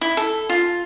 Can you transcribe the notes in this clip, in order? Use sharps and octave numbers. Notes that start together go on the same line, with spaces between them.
E4
A4
F4